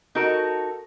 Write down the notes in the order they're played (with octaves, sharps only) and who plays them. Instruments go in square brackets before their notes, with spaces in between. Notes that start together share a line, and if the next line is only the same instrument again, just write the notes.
[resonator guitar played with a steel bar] D#4 F#4 A4 A#4